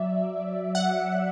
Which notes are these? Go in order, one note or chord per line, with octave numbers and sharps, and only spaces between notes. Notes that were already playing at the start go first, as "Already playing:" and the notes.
Already playing: F#3 D5 E5
F#5